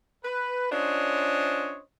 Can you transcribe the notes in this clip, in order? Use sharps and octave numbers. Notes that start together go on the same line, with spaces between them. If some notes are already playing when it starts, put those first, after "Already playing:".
B4
C#4 D4 F4 C5 C#5 D#5